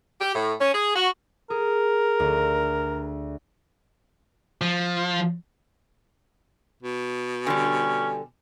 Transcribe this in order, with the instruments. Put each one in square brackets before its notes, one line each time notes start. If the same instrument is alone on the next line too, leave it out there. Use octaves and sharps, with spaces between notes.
[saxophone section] G4
A2
C#4
G#4
F#4
[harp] G#4 [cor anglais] A#4
[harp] D2
[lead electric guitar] F3
[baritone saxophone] B2
[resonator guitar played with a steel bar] D3 G3 [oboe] C#4 [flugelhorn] G#5